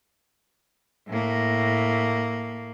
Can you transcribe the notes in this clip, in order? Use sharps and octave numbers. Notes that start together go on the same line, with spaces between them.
A2 A#3